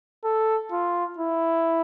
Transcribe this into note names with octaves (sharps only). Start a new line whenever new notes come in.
A4
F4
E4